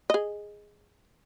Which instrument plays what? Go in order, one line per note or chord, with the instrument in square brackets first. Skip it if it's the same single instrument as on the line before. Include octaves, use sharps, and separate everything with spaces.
[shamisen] G#4 D#5